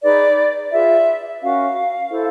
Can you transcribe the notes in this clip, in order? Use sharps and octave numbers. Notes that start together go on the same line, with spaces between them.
D#4 G#4 B4 D5
F4 G#4 B4 E5
C#4 F#4 A#4 F5
E4 A4 C5